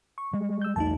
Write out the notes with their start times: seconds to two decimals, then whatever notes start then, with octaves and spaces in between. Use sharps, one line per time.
0.18 C#6
0.33 G3 G#3
0.61 E6 G6
0.76 B1 E2 A3 D#4 A5